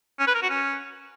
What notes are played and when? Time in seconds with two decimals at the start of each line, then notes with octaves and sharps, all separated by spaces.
0.19 C#4
0.27 B4
0.35 A#4
0.42 F#4
0.50 C#4